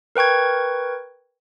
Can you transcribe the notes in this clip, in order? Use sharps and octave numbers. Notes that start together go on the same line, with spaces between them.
A#4 B4 G5 C#6 G#6